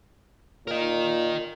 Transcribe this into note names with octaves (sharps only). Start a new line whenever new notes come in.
A#2 A#4 D#5